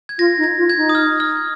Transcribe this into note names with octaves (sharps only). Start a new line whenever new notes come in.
G#6
F4 A#6
D#4
G#6
F4
G#6
D#4
D#6
F6
F6